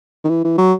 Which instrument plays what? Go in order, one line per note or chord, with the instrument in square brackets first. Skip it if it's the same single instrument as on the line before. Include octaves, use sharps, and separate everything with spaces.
[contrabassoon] D#3
E3
E3
F#3